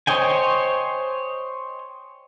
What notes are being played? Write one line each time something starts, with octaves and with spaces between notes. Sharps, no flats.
C5 C#5 D#5 G5 G#5